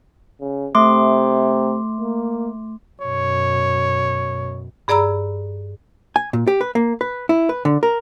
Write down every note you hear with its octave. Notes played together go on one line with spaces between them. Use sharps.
C#3
C3 A3 C6 D6
A#3
F#2 B2 C#5
G2 G#4 D5 A#5 B5 E6
G#5
A#2
G4
B4
A#3
B4
E4
B4
D3
A#4